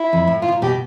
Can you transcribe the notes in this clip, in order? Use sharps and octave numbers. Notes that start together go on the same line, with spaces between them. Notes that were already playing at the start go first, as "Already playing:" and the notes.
Already playing: E4
F2
A2
A2 F4
B2
A#2
B2 G4